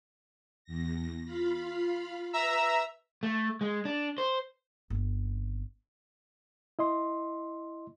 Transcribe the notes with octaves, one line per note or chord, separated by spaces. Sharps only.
E2 A#6
F4 F5 B5
B4 E5 A#5 E6
A3
G#3
D4
C5
G1 C4
E4 D#5 C6